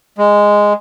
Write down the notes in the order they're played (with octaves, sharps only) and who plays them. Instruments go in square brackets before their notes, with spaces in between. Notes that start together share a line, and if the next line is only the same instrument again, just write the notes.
[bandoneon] G#3